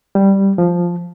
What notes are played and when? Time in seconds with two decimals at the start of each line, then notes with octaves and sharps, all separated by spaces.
0.15 G3
0.58 F3